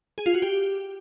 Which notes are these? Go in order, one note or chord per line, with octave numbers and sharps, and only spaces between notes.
G#4
F4
F#4
G4